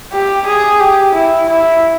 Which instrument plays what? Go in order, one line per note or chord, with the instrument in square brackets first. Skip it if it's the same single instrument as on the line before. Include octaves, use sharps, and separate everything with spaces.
[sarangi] G4
G#4
G4
E4
E4